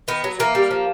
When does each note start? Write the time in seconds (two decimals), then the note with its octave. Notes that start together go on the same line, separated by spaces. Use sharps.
0.08 D#3 B3
0.24 F#3
0.39 E3 A#3
0.55 G3
0.71 F3